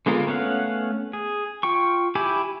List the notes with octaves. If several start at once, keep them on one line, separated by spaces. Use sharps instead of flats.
D3 G#3 B3 F4 A#4
A3 B3 C#4 F5 F#5
G#4
F4 G5 C#6
E4 G4 G#5 B5 D6